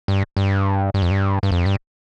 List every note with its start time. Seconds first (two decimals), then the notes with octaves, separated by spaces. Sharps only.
0.08 G2
0.37 G2
0.94 G2
1.02 F2
1.11 G2
1.43 G2
1.52 F2
1.66 G2